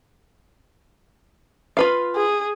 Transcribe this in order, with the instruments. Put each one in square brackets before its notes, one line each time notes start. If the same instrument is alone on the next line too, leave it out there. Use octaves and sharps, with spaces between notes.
[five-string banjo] F4 B4 F5
[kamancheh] G#4